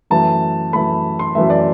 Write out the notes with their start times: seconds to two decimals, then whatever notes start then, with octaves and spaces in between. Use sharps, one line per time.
0.10 F#2 E3 A3 A5
0.73 F#2 E3 A3 B5
1.19 C6
1.35 F#2 E3 A3 E5
1.50 D5